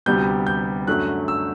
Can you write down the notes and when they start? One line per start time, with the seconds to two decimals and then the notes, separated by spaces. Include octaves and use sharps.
0.06 D2 C3 G3 B3 G6
0.47 G6
0.87 F#2 D3 F#3 A3 F#6
1.28 E6